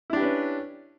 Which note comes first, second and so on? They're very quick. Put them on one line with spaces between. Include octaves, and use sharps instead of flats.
E4 D4 G4 B4 C#4